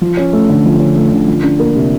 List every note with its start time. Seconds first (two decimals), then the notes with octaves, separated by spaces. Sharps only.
0.01 F3
0.17 C#4
0.33 A3
0.49 D3
0.65 F3
0.80 C#4
0.96 A3
1.12 D3
1.28 F3
1.44 D4
1.60 A#3
1.76 C3